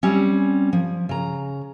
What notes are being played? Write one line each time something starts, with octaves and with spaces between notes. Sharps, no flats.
G3 C4 C#4
F3
C#3 A#5